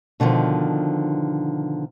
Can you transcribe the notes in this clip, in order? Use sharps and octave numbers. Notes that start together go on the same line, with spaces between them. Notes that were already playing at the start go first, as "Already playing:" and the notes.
B2 D3 D#3 F3